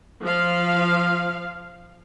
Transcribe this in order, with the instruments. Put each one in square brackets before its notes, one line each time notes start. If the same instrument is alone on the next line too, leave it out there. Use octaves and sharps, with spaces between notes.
[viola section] F3 F5